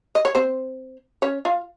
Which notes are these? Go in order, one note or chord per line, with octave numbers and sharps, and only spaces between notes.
D#5
C#5
C4 C5
C#4 C#5
F4 F5